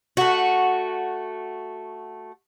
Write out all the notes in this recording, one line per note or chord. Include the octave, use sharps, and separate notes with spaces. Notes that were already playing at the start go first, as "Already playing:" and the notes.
A3 F#4